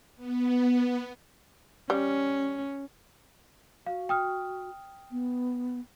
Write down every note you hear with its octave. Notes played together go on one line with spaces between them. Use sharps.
B3
G3 C#4
F#4 F5
G5 D#6 F6
B3